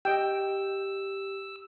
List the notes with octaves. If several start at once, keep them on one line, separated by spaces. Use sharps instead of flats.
G4 D#5 G5 E6